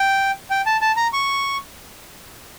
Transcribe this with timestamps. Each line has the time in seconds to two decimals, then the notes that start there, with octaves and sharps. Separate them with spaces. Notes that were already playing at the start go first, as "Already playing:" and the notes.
Already playing: G5
0.51 G5
0.66 A5
0.81 A5
0.96 A#5
1.13 C#6